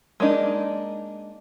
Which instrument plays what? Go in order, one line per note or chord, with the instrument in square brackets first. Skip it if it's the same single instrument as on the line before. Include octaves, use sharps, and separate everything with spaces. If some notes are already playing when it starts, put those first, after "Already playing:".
[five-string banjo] G#3 A#3 D4 D#4